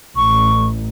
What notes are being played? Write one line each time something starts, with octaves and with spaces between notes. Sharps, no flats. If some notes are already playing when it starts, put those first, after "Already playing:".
A1 C#6